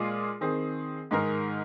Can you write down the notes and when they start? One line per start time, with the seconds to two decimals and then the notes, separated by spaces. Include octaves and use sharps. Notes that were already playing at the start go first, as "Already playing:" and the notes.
Already playing: A#2 G#3 F4 G#4
0.41 D#3 C4 G#4
1.11 G#2 D#3 G#3 D#4 A#4